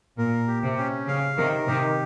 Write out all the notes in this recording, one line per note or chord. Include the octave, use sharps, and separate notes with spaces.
A#2 A#4
G4
C3
C#4
C#3 F5
C3 D#3 A#4
C3 D#3 G4